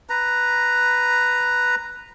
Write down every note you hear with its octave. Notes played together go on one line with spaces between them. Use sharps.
B4 A#5